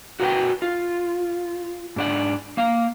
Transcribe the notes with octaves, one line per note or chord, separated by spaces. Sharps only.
F#4 A#4 B4 D#5 F#5 G5
F4
G#2 D4 F#5
A#3 F5